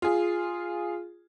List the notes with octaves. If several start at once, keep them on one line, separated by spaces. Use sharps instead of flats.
F4 G#4